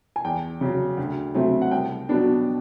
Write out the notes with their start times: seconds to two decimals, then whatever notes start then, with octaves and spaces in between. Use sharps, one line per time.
0.16 G#5
0.24 E2 G5
0.61 C#3 F#3
0.97 D2
1.35 C#3 F#3 A3 C4
1.62 F#5
1.71 C2 G5
2.09 B2 F#3 B3 D4